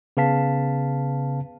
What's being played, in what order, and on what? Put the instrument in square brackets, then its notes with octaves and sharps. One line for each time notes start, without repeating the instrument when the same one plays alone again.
[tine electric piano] C#3 B3 B4 F5 A5 B6